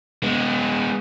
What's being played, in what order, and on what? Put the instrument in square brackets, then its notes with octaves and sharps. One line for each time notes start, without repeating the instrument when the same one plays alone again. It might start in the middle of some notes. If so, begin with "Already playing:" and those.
[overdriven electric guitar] G#3 B3